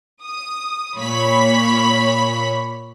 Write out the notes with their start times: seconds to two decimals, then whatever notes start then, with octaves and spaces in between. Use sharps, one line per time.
0.24 D#6
0.97 A#2 C#5 B5 B6